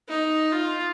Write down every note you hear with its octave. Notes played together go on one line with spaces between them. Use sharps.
D#4
F4